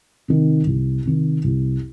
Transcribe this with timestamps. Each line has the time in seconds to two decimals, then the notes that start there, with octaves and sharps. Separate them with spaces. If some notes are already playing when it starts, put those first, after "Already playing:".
0.28 C3 D#3
0.66 C2
1.05 C3 D#3
1.44 C2